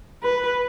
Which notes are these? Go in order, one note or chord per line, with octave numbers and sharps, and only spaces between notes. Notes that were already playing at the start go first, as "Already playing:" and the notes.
B4